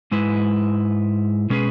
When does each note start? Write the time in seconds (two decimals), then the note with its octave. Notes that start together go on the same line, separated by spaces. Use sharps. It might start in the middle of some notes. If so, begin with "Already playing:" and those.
0.11 G#2 G#3 E4 B4
1.50 B2 G#3 C#4 G#4 B4